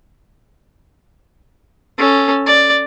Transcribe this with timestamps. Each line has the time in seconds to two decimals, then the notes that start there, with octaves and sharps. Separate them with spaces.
1.98 C#4 A4
2.46 D5